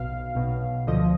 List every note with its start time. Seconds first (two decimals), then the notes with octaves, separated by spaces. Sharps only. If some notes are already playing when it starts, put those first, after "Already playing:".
Already playing: B1 B2 F5
0.35 B1 B2
0.87 D2 D3 F3 D#5